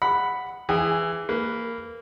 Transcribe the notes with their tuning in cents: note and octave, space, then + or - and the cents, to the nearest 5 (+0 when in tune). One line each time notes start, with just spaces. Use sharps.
F#5 +0 B5 +0
E3 +15 G#4 -10
A#3 -15 B4 +0